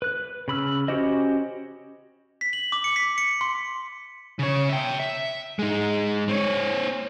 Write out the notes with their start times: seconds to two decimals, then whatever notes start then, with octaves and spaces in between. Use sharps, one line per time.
0.02 B4 F#6
0.48 C#3 B5 E6 F6
0.88 C#4 F#4 G4 C5 D#5
2.41 B6
2.53 F#7
2.72 D6
2.84 C#7
2.96 B6
3.18 C#7
3.41 C6
4.39 C#3 C#5
4.69 E5 G5
5.00 E5
5.59 G#3 D#4
6.29 C4 C#5